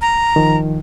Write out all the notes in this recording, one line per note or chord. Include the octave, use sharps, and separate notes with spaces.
A#5
D#3 F3